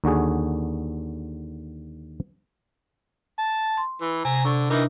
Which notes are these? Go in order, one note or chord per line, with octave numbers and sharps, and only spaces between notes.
D#2 D3 F#4 G#4
A5
C6
E3
C3 G#5 A#5
D3 C#6
E3 D4 D#4 A#4 E5